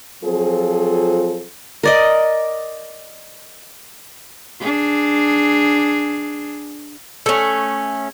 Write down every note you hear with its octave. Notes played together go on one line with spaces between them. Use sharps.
F3 F#3 C4 F4 G#4 A4
A#4 D5 D#5
D4 G#4
A3 C#4